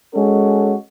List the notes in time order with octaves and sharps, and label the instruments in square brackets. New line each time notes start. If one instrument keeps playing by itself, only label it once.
[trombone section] G#3 C#4 F#4 A4